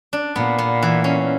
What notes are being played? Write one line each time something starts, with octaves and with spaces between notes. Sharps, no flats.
D4
A#2 B3
B3
E3
C#4